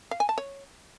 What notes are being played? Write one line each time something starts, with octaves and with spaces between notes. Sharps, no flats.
F5
G#5
A5
C#5